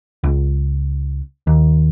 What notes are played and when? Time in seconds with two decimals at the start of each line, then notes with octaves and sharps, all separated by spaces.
0.24 C#2
1.47 D#2